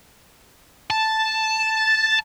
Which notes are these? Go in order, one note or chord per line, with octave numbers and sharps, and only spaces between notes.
A5